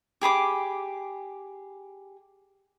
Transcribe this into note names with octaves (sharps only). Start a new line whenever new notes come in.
G4 G#4 B5 D6